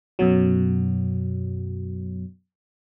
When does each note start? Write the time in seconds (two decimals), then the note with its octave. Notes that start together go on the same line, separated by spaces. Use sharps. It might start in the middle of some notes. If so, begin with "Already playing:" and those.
0.19 F#2 B2 F#3